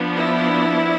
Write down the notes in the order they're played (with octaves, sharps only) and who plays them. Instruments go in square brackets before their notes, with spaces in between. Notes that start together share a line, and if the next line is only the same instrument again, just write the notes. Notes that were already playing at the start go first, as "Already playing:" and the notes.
Already playing: [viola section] F3 B3 D4
E4